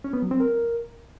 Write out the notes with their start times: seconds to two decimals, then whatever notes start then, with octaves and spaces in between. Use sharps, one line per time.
0.04 C#4
0.13 B3
0.22 F#3
0.31 C4
0.40 A#4